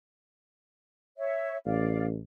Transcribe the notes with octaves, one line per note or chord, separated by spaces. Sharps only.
C#5 E5
A1 D5 F5